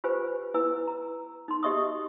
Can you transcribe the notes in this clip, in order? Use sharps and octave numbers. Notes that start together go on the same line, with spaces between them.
F4 G4 B4 C5 G#5
E4 B4 G#5 E6
A#5
D#4 C6
F#4 G4 D#5 E5 C#6 D#6